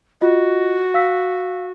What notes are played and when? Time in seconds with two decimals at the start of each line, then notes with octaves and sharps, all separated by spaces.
0.21 F4 F#4 D#5
0.94 F5 E6 B6